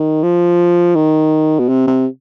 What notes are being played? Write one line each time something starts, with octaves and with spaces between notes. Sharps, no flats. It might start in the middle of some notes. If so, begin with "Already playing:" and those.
Already playing: D#3
F3
D#3
B2
C3
C3